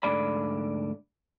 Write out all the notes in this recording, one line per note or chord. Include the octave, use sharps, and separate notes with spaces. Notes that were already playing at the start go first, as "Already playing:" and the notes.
D2 G#2 D3 D5 B5